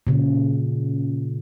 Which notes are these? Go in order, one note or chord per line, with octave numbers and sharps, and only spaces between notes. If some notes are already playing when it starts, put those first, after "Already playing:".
A#2 C#3